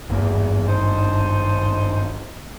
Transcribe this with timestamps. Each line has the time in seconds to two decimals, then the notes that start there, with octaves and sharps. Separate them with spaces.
0.10 G#1 E2 G2 A#3
0.67 D4 D#4 C5